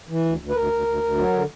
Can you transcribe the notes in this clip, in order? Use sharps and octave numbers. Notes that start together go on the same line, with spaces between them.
E3
D2
D2
B4
D2 A#4
D2
D2
D2
F#3
D3